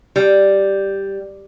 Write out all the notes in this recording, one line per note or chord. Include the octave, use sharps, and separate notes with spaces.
G3